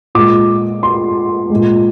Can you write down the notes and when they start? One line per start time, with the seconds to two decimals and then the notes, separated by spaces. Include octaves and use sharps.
0.15 A#2 G#3 D6
0.83 C6
1.50 A#2 G#3